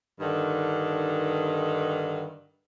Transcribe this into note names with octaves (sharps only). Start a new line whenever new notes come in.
G2 D3 D#3